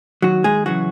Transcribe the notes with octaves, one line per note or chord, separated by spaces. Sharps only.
D#2 D#3 F#3 F#4
G#3 G#4
C#3 E3 F#3 F#4